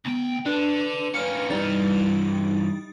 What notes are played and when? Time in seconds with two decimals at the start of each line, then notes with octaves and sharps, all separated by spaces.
0.05 D2 B3 G5
0.46 D3 D4 B4
1.14 A#3 C#4 F6 C#7
1.50 G2 E3 G3 D#4 A6